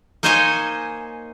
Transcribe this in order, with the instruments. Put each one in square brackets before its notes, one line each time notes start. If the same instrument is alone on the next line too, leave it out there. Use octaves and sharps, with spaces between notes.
[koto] A#3 D#4 C5 C#5 D#5 G#5